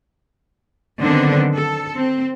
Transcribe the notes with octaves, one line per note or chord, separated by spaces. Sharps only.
D3 D#3 F#3 B3 C4 D4
A4
C4